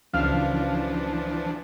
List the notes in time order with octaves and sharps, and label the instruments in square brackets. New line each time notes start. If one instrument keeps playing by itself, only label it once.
[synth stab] C#2 F5 F6 [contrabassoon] F#2 [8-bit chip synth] E3 F3 D4